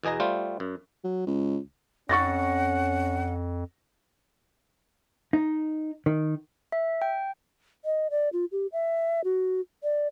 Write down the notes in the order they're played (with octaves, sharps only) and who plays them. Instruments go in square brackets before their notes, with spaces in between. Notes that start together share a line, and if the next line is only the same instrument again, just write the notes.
[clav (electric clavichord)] E2 B2 G#4 D#5 A#5
G3 A3 F4 C5
F#2
[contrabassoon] F#3
C#2
[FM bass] F2 [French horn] C#4 [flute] F#5 [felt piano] C#6 A6 A#6
[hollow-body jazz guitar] D#4
D#3
[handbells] E5
G5
[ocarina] D#5
D5
F4
G4
E5
F#4
D5